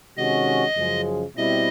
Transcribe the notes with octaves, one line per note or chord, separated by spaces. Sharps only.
C3 D#3 G#3 C#4 F#4 D#5
F#2 C#3 F3 G#3
B2 G3 C4 E4 D#5